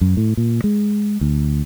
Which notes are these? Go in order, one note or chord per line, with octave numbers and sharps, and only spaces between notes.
F#2
A2
A#2
G#3
D2